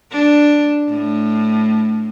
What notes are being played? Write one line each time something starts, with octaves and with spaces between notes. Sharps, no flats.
D4
A2